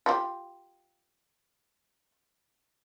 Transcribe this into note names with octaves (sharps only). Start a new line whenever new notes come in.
F4 G4